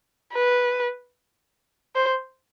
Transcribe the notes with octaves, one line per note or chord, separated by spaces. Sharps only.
B4
C5